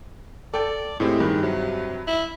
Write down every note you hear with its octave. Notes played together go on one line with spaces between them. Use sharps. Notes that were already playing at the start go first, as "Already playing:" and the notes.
A4 D5 G5
A2 G#3 C4 E4 G4
G2 D#3
C3 F#3
E4